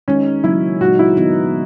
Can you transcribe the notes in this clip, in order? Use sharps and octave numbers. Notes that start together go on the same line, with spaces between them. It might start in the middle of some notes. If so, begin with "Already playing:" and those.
D#3 G#3 C#4 D#4
C#3 F#3 A#3 E4
A#2 G#3 D#4 F#4
E4
D#3 F#3 B3 D#4